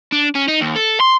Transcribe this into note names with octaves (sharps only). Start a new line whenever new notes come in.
D4
C#4
D#4
D#2
A4
C6